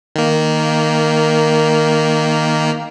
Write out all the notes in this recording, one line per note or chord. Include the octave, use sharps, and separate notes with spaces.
D#3 A#3